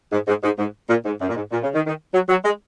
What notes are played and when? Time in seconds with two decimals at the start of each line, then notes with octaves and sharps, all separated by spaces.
0.12 G#2
0.28 G#2
0.43 G#2
0.59 G#2
0.90 A#2
1.05 G#2
1.21 F#2
1.29 A#2
1.36 G#2
1.52 A#2
1.63 C#3
1.75 D#3
1.87 D#3
2.14 F#3
2.29 F#3
2.45 G#3